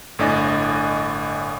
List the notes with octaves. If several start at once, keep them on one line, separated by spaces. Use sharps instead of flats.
G1 A2 D4 D5 D#5 G#5